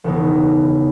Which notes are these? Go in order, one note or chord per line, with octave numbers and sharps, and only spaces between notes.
E1 C#3 E3 B3 D#4